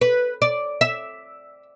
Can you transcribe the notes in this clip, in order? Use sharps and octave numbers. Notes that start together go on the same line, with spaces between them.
B4
D5
E5